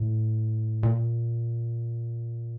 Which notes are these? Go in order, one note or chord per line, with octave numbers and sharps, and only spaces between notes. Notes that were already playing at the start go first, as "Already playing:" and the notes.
Already playing: A2
A#2